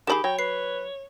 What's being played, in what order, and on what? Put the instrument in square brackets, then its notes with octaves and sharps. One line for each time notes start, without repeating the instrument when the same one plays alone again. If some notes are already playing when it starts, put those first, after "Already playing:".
[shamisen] D#3 D4 G#4 [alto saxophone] G4 [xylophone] B5 E7
[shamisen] F#3 [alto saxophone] C#5 [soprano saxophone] G5
[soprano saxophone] B4 [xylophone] C7